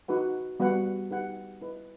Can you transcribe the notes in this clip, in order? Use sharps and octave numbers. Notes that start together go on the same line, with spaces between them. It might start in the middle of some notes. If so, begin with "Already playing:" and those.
D#4 F#4 B4 F#5
G3 B3 F#4 B4 F#5
D#4 G4 B4 F#5
E4 B4 D#5